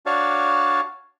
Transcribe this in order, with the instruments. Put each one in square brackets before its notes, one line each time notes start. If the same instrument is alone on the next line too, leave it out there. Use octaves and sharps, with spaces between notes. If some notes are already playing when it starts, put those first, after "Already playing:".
[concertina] D4 F#4 C#5 D5 F5 A5